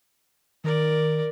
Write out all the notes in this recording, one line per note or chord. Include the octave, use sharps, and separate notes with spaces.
D#3 A#4 D5